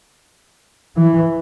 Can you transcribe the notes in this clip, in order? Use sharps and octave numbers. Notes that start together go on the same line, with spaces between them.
E3